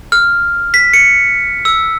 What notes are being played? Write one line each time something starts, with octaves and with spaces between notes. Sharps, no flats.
F6
B6
C#7
E6